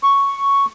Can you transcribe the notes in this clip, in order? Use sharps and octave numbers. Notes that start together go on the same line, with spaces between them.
C#6